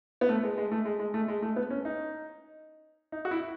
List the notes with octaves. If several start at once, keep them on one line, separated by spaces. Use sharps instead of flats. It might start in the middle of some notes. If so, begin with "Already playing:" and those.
B3
A3
G#3
G#3
A3
G#3
G#3
A3
G#3
A3
B3
C#4
D#4
D#4
F#4
E4